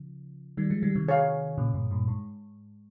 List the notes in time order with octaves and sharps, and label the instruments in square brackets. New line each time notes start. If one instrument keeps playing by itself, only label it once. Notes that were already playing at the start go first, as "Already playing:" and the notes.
Already playing: [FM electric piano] C#3 F3
D#3 G3
F3 G#3
D#3 G3
C3 D#3
[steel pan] G#4 C#5 F5
[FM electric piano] A#2 C#3
G2 A#2
G2 A#2
G#2